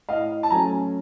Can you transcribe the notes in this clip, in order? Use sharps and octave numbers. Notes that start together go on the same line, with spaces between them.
A2 D#5 F5
A5
F#3 A3 C#4 G#5 A#5